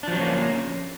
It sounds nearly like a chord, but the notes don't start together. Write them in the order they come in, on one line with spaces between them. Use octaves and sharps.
D4 F3 F#3 C#4 A#3